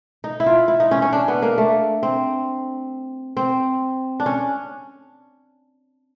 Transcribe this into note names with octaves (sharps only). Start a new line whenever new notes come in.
D#4
E4
F4
E4
D#4
C#4
C#4
D4
B3
A#3
A3
C4
C4
D4
C#4